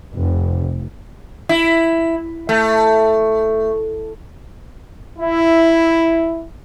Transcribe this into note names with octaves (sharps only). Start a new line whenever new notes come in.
F1
E4
A3
E4